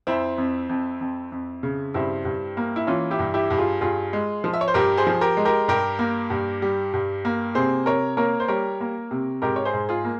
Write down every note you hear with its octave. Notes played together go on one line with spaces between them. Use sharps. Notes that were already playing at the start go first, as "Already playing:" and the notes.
F2 C4 E4
F2
F2
F2
F2
C#3
G2 C4 E4
G2
A#3
E4
E3 C#4 F4
E4 G4
G2
E4 G4
G2
F4 G#4
G2 F4 G#4
G#3
F3
E5
C#5
C5
G2 G4 A#4
G#4 C5
F3
G4 A#4
G#3
G4 A#4
G2 G4 A#4
A#3
G2
G3
G2
A#3
C3 G#4 C5
C3 A#4 C#5
A#3 A#4 C#5
C5
G3 A#4 C#5
A#3
C3
G#2 G4 A#4
C#5
G#4 C5
G#2
F4 G#4
A#3